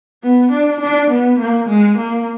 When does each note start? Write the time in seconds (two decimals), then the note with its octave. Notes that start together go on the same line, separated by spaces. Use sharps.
0.23 B3
0.52 D4
0.81 D4
1.11 B3
1.40 A#3
1.69 G#3
1.98 A#3